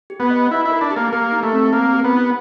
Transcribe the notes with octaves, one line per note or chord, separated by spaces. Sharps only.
G4
B3
D#5
D#4 E4
E4
A#4
D4
G4
A#3
A#3 G4
D#4
A3
C4
A#3 C4
G4
B3
D#4